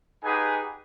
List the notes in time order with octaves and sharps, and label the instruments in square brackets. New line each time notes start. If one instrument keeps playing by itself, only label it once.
[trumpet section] D#4 G4 G#4 B4 F#5 G#5